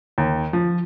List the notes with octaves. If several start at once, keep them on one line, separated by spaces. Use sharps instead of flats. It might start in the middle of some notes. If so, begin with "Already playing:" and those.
D#2
F3